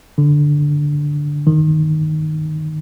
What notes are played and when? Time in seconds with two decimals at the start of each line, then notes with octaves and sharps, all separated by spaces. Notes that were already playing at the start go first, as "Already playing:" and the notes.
0.18 D3
1.47 D#3